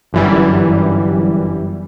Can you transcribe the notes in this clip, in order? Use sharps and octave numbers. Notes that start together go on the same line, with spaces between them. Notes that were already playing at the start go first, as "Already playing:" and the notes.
G1 F#2 E3 G3